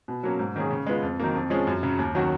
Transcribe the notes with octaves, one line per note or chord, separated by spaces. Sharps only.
B2
F#3 A#3 C#4
G#2
D#3 A#3 C#4 G#4
C#3
G#3 B3 F4
F2
D#3 F#3 A#3
F2
F3 G#3 C#4 G#4
F#2
C#3 F#3
D#2
D#3 F#3 C#4 F#4